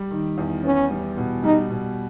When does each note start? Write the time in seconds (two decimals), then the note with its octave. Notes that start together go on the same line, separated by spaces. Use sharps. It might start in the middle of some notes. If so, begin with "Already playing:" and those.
Already playing: G3
0.11 D#3
0.38 E2
0.64 B3 C#4
0.91 G3
1.17 B2
1.44 G3 D#4
1.70 B2